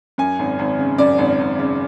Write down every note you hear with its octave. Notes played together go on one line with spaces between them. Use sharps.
F#2 G#5
G#1
G#1
C#3
F#2 D5
G#1
G#1
C#3